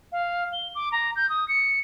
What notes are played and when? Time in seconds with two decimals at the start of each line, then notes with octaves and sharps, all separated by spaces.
0.12 F5
0.53 G7
0.75 D6
0.92 A#5
1.16 G6
1.29 D#6
1.48 C#7